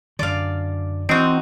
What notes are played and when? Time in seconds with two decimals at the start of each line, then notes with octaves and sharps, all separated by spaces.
0.19 F#2 D3 D5 F5
1.09 E3 C4 D#4 F#4